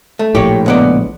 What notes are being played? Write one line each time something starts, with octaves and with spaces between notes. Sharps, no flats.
A3
A#1 A2 G4 C#5
C#2 B3 D5